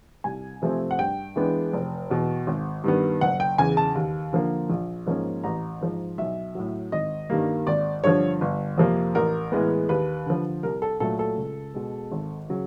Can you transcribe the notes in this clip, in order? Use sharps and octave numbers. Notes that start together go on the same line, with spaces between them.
C2 G#5
C3 F3 A3 C4
F#5
G2 G5
E3 G#3 B3 D4
F1
E2 B2
G#1
G2 D#3 G3 B3
F#1 F#5
G5
E2 C#3 G#5
A5
D#2
D3 F3 A#3
A#1
G#2 F3 A#3 C#4
A1 A#5
G#2 F3
B1 E5
A2 F#3
G#1 D#5
G2 D#3 G3 A#3
G#1 D5
G2 D3 F3 C#5
G1
F2 C3 F3 A#3
A1 A#4
A2 E3 G#3 B3
D#2 B4
D3 F3
C2 A#4
A4
A#2 F#3 A3 A4
A4
C#2
B2 G#3
G#1
C#3 F#3